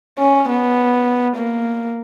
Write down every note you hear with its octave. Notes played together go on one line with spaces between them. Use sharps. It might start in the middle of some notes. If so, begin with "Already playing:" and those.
C#4
B3
A#3